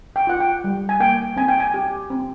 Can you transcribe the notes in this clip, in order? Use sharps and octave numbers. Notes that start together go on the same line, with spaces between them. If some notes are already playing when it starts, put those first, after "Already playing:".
G5
F4 F#5
G5
G3
G#5
A#3 G5
C4 G#5
G5
G#5
G4
C4